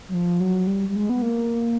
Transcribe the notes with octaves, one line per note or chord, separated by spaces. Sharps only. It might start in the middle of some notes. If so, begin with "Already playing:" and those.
F#3
F3
F#3
G3
G3
G#3
B3
A#3